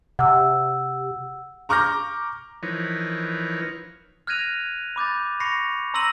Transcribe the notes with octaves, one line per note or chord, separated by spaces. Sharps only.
C3 F#5 E6
A#5 C#6 D6 F6 G6 A#6
E3 F3 D#4 A#4 B4 C#5
F6 F#6 G#6 A#6 D#7 F7
B5 D6 G6 A6
B5 C#6 A#6 C7 C#7 F7
A#5 C6 E6 A#6 D#7 F#7